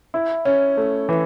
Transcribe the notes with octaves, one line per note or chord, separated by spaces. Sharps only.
E4
C#4
A3
E3